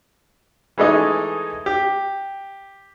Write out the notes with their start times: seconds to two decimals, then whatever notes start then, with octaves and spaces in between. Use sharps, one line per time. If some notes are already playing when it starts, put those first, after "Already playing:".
0.78 E3 G#3 A3 D#4
1.66 G4